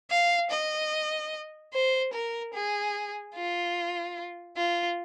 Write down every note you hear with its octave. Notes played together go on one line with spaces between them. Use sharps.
F5
D#5
C5
A#4
G#4
F4
F4